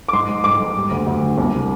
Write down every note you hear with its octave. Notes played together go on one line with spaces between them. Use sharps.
D6
G#2 C6
G#2
G#2 D6
G#2
G3
D2
D2
D3
C2
C3